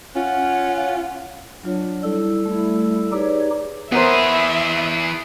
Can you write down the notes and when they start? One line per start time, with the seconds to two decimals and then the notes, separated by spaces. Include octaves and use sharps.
0.15 C#4 F4 F#5
1.63 F#3 D4 F4 C#5
2.03 G3 E4 A4
2.45 A3 E4
3.12 D#4 G4 G#4 B4 C#5 D5
3.92 E3 B3 G#4 A#4 C5 E5